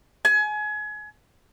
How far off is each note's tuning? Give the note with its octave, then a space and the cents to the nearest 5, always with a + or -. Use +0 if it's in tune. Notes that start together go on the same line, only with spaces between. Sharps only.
G#5 +30